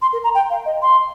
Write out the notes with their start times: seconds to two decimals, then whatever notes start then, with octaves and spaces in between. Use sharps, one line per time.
0.02 C6
0.13 A#4
0.24 A#5
0.35 G5
0.50 F5
0.65 D#5
0.82 C6